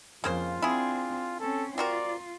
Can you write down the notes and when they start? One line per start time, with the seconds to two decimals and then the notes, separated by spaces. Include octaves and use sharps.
0.24 F2 C#3 A#3 F4 C5
0.62 C4 D4 E4 G#4
1.40 C4 C#4 A4
1.78 C4 F4 F#4 A#4 D5